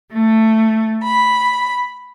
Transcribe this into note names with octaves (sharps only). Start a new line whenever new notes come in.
A3
B5